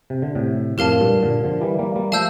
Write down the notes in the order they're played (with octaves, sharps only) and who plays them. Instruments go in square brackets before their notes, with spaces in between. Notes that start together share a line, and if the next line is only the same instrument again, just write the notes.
[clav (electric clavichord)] C3
D3
A2 C3
[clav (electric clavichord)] F2 A2 [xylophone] G4 A#4 F5 A5
[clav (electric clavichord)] G2 A#2
A#2 D3
D3 F3
E3 G3
G3 A#3
G3 A#3
[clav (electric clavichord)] F3 A3 [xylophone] F5 A5 E6 G6